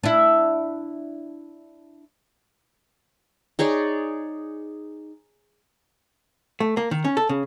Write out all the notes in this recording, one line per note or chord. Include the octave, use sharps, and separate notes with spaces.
D4 E4
D#4 G#4 C#5 D5
A3
A#3
D#3
C#4
A4
C#3